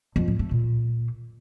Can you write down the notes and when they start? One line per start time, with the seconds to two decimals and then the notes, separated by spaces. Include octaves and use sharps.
0.16 F2
0.28 A2
0.39 A3
0.51 A#2